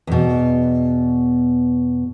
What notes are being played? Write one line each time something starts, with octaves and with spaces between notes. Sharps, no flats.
E2 B2